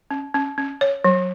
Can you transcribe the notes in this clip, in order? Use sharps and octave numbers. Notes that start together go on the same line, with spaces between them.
C#4
C#4
C#4
C#5
F#3